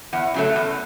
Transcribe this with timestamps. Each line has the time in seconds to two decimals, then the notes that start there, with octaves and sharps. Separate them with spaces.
0.13 E2 F#5
0.34 C#3 F#3 A3
0.56 E2